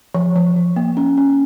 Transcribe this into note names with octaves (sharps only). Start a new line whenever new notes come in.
F3
F3
F3
A#3
C#4
C#4